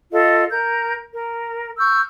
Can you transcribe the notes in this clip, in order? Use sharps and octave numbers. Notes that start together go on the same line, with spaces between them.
F4 A4 D#5
A#4 G6
A#4
C#6 E6 F6 G6